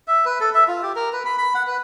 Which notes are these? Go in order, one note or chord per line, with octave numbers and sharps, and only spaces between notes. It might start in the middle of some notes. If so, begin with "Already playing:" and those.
E5
B4
A4
E5
F4
G4
A#4
B4
B5
B5
F#5
B4